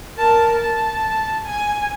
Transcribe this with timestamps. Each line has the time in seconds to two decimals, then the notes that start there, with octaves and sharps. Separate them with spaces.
0.18 A#4 A5
0.58 A5
1.45 G#5